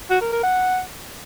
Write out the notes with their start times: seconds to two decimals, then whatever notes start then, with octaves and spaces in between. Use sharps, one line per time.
0.11 F#4
0.22 A#4
0.33 A#4
0.44 F#5